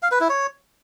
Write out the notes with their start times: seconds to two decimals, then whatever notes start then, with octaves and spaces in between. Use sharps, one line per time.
0.03 F5
0.12 B4
0.21 E4
0.30 C#5